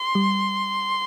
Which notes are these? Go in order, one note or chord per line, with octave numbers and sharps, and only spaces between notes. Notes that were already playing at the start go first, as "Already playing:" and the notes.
Already playing: C6
G3